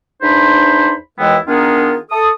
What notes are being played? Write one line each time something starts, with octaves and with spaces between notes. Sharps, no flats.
E2 D4 D#4 C5 B5 C6
D#2 E3 G#3 B3 E4 G5
D#3 B3 D4 F4 G#4 A#4
A4 D#6